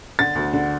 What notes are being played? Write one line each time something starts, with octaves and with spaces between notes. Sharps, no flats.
D3 A6
D2
D3